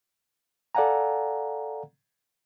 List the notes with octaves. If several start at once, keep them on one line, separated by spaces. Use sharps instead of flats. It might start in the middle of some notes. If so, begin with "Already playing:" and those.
A4 D5 F5 F#5 G#5 A#5